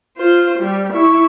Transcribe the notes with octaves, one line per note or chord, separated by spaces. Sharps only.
F4 C5
G3
E4 C#6